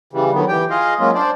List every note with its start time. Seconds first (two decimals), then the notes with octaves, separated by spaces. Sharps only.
0.13 C#3 E3 G3
0.34 D3 D#3 F#3 B3
0.48 E3 G4 G5
0.70 F4 G#4 D#5 F5
1.00 F#3 G#3 A#3 C#4 F4
1.15 D4 C5 D5